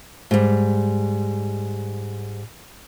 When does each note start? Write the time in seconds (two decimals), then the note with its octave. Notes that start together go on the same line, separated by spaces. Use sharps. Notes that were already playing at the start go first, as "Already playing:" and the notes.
0.31 G#2 G3